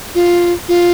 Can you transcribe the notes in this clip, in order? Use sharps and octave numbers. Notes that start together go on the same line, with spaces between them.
F4
F4